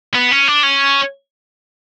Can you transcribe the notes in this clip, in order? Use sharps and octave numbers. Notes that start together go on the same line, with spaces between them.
B3
C#4
D4
C#4